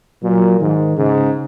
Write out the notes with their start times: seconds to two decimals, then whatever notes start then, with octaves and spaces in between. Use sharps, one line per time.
0.23 A#2 F#3
0.60 G#2 D#3
0.97 G#2 C#3